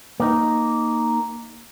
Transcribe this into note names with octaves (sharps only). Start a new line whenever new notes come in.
A#3 D#4